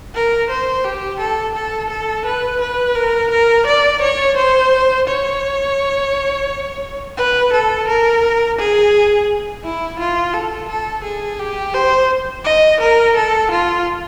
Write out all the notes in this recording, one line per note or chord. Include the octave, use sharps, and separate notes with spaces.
A#4
C5
G4
A4
A4
A4
B4
B4
A#4
A#4
D5
C#5
C5
C#5
B4
A4
A#4
G#4
E4
F4
A4
A4
G#4
G4
C5
D#5
A#4
A4
F4